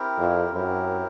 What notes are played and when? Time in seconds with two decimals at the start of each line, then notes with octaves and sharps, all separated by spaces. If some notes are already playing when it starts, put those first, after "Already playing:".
Already playing: C4 E4 G4 A#4
0.19 F2
0.53 F#2 C4 E4 G4 A#4